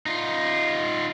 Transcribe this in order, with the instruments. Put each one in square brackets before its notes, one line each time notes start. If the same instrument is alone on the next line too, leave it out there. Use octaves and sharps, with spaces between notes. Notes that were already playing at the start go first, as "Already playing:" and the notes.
[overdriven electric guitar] D#4 F4